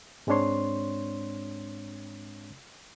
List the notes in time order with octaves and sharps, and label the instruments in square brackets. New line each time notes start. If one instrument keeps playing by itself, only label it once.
[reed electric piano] G#2 G#3 C4 D4 C#5 C6